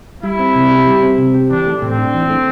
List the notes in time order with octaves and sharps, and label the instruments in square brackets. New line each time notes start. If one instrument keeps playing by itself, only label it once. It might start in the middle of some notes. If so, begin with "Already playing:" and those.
[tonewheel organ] G3 [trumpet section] E4
[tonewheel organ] C4
C3
G4
G3
C4
C3
G4
[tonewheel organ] E3 [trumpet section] D4
[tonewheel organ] A3
[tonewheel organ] A2 [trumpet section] C4
[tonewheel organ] D4
E3
A3